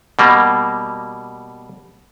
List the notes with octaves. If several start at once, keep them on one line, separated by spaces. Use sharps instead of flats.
B2 G3 A#3